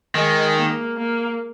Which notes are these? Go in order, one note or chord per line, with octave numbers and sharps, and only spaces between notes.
D#3 G#3
A#3
A#3